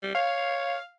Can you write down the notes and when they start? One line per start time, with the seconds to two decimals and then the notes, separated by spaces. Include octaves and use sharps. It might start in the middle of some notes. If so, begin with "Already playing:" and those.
0.03 G3
0.15 C#5 F5